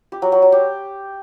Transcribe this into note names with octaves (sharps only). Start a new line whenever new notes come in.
G4
F#3
F#3
F#3
G4